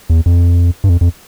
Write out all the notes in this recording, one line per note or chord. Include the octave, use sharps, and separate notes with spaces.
E2
F2
G2
F2
F2